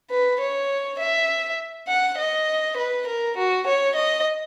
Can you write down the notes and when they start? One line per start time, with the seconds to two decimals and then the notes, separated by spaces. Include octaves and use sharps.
0.10 B4
0.41 C#5
0.99 E5
1.88 F#5
2.19 D#5
2.77 B4
3.07 A#4
3.38 F#4
3.67 C#5
3.96 D#5